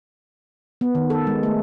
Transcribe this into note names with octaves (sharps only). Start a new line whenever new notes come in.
B3
D#3
A4
G#3
A3